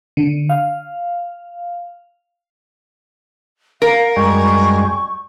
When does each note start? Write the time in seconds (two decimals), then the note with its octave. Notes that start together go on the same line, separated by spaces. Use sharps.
0.17 D3
0.49 F5
3.82 A#4 F5
4.16 F#2 G3 G#3 C#6